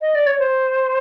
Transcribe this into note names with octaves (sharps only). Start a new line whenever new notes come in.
D#5
D5
C#5
C5